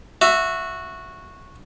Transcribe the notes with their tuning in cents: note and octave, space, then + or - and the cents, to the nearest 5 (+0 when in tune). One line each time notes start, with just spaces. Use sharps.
F#4 -10 E5 +10